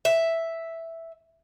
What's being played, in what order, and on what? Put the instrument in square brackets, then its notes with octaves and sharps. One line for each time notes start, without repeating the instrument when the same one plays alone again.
[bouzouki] E5